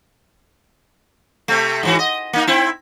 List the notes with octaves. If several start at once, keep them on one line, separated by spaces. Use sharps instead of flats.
C3 A3
G#2 E3 F#4
D#5
A#3 D#4
C4 E4